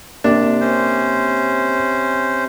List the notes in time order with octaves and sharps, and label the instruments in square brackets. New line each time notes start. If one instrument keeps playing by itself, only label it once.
[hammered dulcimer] C3 [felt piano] A#3 [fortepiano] D4
[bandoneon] C#4 C5